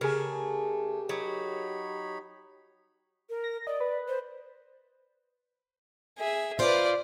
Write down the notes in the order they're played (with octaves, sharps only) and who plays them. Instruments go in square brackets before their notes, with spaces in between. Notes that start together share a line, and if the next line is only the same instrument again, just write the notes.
[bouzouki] C#3 A3 [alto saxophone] G4 [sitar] G#4 A#4
[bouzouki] F#3 [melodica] D#4 C#5 B5
[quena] A#4
[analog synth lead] A#6
[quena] D5 [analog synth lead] D#5
[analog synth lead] B4
[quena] C5
[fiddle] G#4 E5
[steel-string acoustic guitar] F4 C5 [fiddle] B4 D5